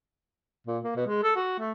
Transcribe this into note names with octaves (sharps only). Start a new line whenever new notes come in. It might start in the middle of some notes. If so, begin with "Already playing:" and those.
A#2
A#3
B2
G#3
A4
F#4
A3